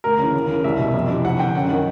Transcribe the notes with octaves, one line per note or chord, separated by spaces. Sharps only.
D2 A#4
C#3 E3
D#2
C#3 E3
C2 E5
B2
F2
C3 E3
F2 F#5
D3 G5
F#2 F#5
D#3